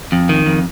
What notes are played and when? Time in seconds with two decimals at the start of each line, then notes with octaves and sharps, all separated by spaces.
0.12 F2
0.29 D#3
0.46 F2